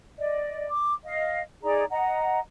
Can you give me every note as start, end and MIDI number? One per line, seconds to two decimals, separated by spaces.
0.18 0.68 74
0.18 0.68 75
0.69 0.94 86
1.04 1.42 75
1.04 1.42 77
1.63 1.84 63
1.63 1.84 68
1.63 1.84 74
1.63 1.84 82
1.90 2.39 75
1.90 2.39 78
1.90 2.39 82